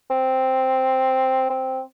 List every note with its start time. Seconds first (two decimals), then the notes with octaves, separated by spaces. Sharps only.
0.11 C4
1.50 C4